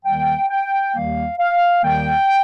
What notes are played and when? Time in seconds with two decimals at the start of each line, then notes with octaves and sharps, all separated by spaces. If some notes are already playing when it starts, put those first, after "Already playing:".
0.05 D#2 D#3 G3 A#3 G5
0.50 G5
0.94 D#2 D#3 G3 A#3 F5
1.39 F5
1.83 D#2 D#3 G3 A#3 G5